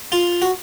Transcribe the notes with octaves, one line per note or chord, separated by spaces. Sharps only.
F4
F#4